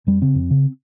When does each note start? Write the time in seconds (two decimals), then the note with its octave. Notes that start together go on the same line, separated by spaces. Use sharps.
0.07 F2 G3
0.22 C#3 C4
0.35 F2
0.51 C#3